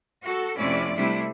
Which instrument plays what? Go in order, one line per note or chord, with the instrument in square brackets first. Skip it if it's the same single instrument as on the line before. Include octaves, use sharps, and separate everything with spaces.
[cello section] F#4 A4
F2 C3 A3 C#4 E4 D5
C3 G3 A3 D4 E4